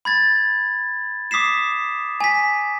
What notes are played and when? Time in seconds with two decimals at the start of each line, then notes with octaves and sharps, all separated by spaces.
0.05 B5 G#6 A6
1.31 D6 D#6 B6 C7 E7
2.20 G#5 B6